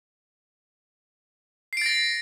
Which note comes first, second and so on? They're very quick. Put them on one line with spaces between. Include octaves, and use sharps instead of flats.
C7 D7 A6 A#6